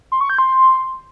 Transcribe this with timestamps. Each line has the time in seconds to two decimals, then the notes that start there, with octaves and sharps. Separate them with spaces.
0.12 C6
0.21 C#6
0.30 G6
0.38 C6